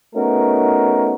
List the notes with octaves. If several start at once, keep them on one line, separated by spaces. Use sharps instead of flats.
A3 B3 C#4 D#4 F#4 A#4